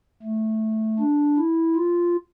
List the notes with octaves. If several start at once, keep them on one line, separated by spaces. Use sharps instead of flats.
A3
D4
E4
F4